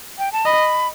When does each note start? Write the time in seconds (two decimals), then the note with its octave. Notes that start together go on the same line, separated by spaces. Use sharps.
0.19 G5
0.32 A5
0.45 D#5 B5